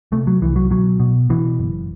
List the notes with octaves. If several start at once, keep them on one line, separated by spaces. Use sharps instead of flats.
C3 A3
F#3
C2 E3
F#3
B2 F#3
B2
B2 E3
F#1